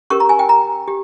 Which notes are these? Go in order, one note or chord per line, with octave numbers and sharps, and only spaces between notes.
C#4 G4 A#4 C#6
A#5
G#5
G5
A#5
G4